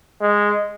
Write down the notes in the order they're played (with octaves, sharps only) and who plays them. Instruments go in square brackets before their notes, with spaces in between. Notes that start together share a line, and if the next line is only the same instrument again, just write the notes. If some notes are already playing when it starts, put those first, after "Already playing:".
[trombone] G#3